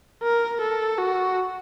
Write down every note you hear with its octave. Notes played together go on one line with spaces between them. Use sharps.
A#4
A4
F#4